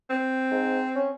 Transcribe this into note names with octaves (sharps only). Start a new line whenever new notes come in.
C4
G#2
C#4